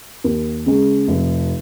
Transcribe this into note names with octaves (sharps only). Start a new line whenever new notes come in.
D#2
C#3 G#3
F1